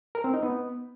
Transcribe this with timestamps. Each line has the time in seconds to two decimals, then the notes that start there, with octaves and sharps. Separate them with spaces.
0.15 A#4
0.24 C4
0.33 D#4
0.43 B3